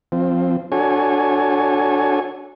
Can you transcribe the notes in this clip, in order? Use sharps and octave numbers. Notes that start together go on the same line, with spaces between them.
F3 C4
D4 F#4 A4 C#5 G#5